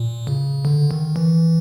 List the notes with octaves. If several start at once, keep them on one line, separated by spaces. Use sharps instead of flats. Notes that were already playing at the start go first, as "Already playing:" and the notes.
Already playing: A#2
C#3
D3
D#3
E3